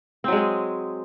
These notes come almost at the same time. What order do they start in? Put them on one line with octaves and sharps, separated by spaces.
C4 F#3 G#3 G#4